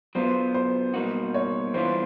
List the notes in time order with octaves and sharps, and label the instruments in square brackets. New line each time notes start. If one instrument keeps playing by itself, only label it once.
[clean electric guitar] F#3 B3 D4 F4 [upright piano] C5
[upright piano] C5
[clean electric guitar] B2 G3 A#3 D#4 F#4
[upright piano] C#5
[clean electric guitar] E3 G3 B3 D4 F4 [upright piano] C5